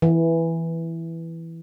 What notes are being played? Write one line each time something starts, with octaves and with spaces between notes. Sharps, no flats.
E3